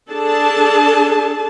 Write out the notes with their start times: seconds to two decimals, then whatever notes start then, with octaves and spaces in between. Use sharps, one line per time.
0.11 D4 G#4 A4 A5